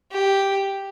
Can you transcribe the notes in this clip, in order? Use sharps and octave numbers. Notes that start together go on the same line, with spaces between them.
G4